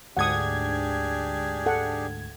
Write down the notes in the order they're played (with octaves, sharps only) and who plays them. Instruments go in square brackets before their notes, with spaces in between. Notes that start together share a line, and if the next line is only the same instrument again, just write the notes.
[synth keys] D2 G#2 G#6 [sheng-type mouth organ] D4 G4 G#4 [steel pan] F#5 D#6
[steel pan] A4 F#5 G5